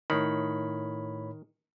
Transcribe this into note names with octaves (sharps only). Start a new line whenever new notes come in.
A2 D#3 C#5 B5